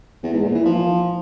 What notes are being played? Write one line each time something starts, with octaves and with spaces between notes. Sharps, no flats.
E2
G#2
A#2
E3
F3